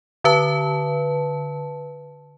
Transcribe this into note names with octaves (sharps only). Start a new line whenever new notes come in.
D3 B4 A5